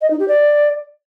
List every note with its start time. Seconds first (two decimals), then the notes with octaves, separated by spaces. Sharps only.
0.02 D#5
0.11 D#4
0.19 G4
0.28 D5